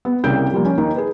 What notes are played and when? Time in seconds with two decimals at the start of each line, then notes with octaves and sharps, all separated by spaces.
0.05 B3
0.24 C2 C#3 A#3 G5 G6 D7
0.52 F3 G3 A#3
0.65 C#4
0.77 D#2 D#3 A#3 D#4
0.96 G#4 B4